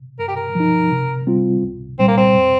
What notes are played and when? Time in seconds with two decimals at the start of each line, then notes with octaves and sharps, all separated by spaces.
0.19 G2 A#4
0.28 G4
0.36 A#4
0.55 F3 D#4
0.91 C3
1.27 G3 C4 F4
1.63 C2
1.99 A#2 G3 C4
2.08 A#3
2.17 C4
2.35 F2